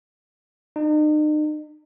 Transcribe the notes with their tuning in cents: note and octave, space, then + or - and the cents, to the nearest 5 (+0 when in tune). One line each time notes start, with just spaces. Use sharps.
D#4 -40